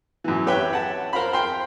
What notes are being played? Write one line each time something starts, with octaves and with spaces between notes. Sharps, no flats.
F#2 E3
G4 B4 C#5 E5 G5 F#6
F#5 A5
A#4 C5 F5 B5
G5 C6